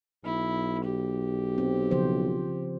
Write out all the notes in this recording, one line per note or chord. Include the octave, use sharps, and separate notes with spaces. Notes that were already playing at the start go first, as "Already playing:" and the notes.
B1 E4
G4
C4
C#3 F3 C5